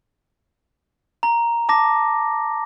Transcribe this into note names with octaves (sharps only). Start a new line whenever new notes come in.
A#5
A5 D6 A#6